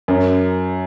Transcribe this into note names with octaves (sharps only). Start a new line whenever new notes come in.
F#2